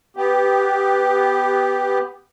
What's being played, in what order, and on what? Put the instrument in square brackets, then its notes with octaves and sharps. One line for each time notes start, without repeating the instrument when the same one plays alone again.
[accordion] B3 G4